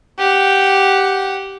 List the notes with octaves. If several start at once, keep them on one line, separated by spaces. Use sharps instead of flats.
G4 F#5